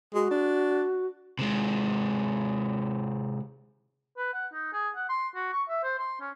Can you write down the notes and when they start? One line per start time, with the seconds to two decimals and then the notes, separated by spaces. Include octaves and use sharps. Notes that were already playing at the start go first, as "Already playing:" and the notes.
0.14 G#3 F#4
0.31 D4
1.39 C3 G#3
4.17 B4
4.33 F#5
4.53 D#4
4.73 G#4
4.96 F#5
5.09 C6
5.35 F#4
5.53 C#6
5.69 E5
5.84 C5
5.98 C6
6.20 C#4